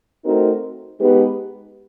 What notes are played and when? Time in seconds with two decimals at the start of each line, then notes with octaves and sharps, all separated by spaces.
0.24 A3 C4 D#4 F#4 A#4
0.99 G#3 B3 D#4 G4 B4